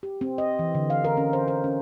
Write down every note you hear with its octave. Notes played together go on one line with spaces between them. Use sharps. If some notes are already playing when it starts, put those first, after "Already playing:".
G4
C4
D#5
E3
D3
F5
A#4
C#4
C5
C5
C#4